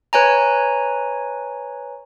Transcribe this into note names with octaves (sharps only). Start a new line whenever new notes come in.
B4 C#5 G#5 A#5